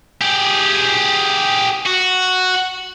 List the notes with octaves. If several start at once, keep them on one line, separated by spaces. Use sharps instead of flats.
G4 G#4
F#4